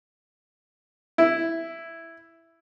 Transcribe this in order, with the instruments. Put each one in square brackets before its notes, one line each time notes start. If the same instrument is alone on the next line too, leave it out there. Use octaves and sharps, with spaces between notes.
[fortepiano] E4